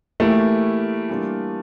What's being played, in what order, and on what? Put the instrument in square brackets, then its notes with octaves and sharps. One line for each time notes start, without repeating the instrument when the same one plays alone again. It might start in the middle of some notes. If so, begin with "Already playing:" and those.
[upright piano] E3 A#3 E4 G4 A#4 [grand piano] A3
[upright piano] E3 G3 A#3 D4 F4